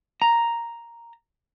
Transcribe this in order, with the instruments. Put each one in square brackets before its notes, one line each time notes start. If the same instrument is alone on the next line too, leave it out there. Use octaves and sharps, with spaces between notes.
[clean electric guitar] A#5